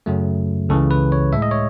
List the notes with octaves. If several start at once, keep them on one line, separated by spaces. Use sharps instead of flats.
F#2 C#3 F#3 A3
C#2 C#3 E3 A4
B4
C#5
A2 G#3 E5
D#5
C#5